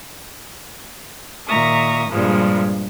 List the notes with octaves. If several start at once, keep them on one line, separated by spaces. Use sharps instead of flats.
A#2 D#3 E5 A#5 C#6 D#6
G2 A#2 F3 G3 G#3